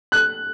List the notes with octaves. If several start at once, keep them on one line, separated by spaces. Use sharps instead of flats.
F#6